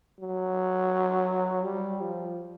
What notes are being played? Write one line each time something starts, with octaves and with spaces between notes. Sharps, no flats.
F#3
G3
F3